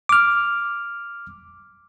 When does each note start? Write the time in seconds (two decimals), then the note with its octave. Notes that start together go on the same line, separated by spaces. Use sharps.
0.09 D6 F6